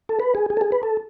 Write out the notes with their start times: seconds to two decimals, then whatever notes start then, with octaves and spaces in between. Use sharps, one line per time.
0.09 A4
0.20 B4
0.35 G#4
0.50 G#4
0.57 A4
0.61 G#4
0.72 B4
0.83 A4